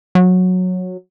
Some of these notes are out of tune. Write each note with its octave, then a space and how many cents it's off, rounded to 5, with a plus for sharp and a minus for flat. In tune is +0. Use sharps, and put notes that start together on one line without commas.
F#3 -15